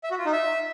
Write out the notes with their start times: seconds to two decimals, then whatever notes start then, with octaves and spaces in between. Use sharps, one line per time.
0.04 E5
0.11 F#4
0.18 F4
0.25 D#4
0.33 E5